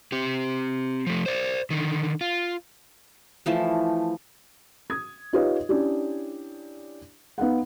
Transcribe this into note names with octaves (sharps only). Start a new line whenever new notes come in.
C4 G4
F3 A3
C5 D5
D3 D#3
F4
E3 F3 A3 E4
D#6 G#6
D#4 F4 G4 B4 C#5 D#5
C#4 D4 E4 G4
B3 D#4 F5 F#5